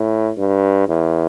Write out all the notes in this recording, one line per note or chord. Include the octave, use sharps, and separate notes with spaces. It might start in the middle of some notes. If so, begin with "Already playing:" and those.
Already playing: A2
G2
E2